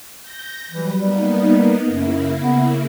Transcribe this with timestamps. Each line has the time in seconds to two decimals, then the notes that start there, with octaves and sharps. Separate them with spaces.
0.20 G6 A#6
0.71 E3 F#3 G3 B4
1.00 G3 A#3 B3 D#4
1.88 F#2 C#3 A#3 E4
2.42 B3